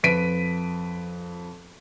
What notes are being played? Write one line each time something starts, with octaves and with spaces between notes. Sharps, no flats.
F2 B4 B6 D7 D#7